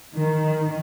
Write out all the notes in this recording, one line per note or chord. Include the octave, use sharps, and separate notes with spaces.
D#3